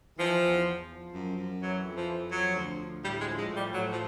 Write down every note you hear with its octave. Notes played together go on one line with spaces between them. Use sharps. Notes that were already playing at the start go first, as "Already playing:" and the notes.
E3 F3
E2
E2
F3
F#2
F#2
E3 F#3
F2
F3
F2
F3 F#3
D2
D2
A2 G3
G#3
F3
G#3
A2
G3
A2 F#3
F3